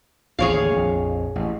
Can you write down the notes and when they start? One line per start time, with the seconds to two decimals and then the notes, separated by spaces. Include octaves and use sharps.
0.39 A1 D#2 D3 G#4 C#5 F5
0.72 A#1 F2
1.35 A1